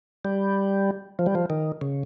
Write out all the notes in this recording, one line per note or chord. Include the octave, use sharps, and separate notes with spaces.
G3
F3
G3
F3
D#3
C#3